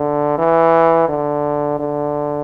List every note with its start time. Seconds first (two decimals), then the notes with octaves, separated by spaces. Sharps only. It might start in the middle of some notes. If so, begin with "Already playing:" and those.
Already playing: D3
0.38 E3
1.09 D3
1.79 D3